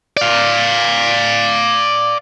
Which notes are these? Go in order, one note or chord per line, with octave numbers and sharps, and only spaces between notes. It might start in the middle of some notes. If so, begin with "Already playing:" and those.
D5 F5